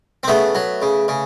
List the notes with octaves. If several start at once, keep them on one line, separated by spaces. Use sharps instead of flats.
C4
C#3 A3 B3
F#3
C#3
C#3